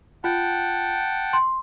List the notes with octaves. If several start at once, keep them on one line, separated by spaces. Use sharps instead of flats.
F4 F#5 G5 A5
C6